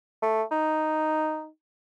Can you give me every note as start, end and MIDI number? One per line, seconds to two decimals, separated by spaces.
0.22 0.43 57
0.51 1.47 63